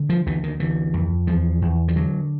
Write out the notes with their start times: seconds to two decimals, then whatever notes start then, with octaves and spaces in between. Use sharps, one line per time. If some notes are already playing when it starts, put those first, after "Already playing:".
Already playing: D3
0.09 F3
0.26 D2 E3
0.43 D#3
0.60 D3 E3
0.94 F2
1.27 E2 F3
1.62 E2
1.88 F3
1.96 D3 F#3